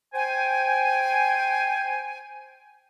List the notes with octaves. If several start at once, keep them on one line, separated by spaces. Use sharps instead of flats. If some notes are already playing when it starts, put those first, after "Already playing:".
C5 G5 G#5